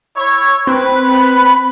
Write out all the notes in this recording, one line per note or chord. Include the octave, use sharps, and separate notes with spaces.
E4 C#5
C4 B4
B5